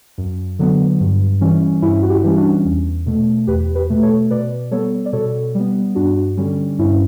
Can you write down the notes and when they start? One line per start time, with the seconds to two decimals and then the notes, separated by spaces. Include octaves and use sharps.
0.18 F#2
0.59 D3 F#3 B3
1.00 G2
1.41 E3 G3 C#4
1.82 G2 C#4 E4
2.02 F#4
2.10 E4 G4
2.23 E3 G3 C#4
2.37 D4 F#4
2.65 E2
3.06 B2 A3
3.47 E2 G4 B4
3.75 G4 B4
3.90 B2 A3
4.02 A4 C#5
4.30 B2 B4 D5
4.71 G3 B3 A4 C#5
5.06 D5
5.13 B2 A4 C#5
5.55 G3 B3
5.95 G2 D4 F#4
6.37 D3 G3 C#4
6.79 G2 C#4 E4